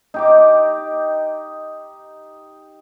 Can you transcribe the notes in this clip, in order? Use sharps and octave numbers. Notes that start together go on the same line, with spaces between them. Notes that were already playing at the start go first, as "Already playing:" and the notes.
D#4 G4 D6